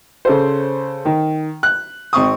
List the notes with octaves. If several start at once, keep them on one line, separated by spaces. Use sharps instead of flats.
C#3 A4 C5
D#3
F#6
G#1 C4 C#6 D#6